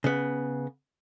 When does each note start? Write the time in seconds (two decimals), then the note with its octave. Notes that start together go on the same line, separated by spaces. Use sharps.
0.04 C#3 B3